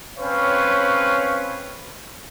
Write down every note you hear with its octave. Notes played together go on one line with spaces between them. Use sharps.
C4 C#4 B4 C#5 F5